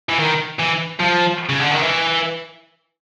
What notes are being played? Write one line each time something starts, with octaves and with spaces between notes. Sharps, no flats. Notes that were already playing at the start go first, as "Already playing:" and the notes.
E3
D#3
E3
F3
C#3
D3
D#3
E3